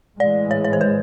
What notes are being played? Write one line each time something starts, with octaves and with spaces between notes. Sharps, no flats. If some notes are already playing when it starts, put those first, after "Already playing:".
A2 E3 G#3 D5
C#5
C#5
C5
B4